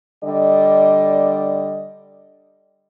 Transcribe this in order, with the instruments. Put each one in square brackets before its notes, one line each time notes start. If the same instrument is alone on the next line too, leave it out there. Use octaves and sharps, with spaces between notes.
[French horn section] D3 G3 D5 D#5